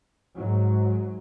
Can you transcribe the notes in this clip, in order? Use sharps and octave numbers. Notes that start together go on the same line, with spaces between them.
G#2 F#3